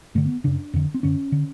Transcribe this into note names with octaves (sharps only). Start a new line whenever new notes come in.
G2 D3 A3
B3
F#2 C#3 D4
F2 D3
C4
F#2 D3 C#4
D3